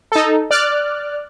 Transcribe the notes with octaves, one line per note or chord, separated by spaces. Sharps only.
D#4 A4
D5 F6 F#6